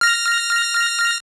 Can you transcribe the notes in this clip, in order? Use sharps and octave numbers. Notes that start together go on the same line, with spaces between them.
F6 A#6